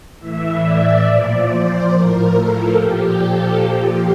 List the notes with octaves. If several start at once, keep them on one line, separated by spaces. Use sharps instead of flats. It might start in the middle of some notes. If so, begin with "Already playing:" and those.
A2 E3 E5
D5
A#2 F3 D5
C5
A2 F3 A#4
A4
A#2 F3 G4
A4
A#2 F3 G4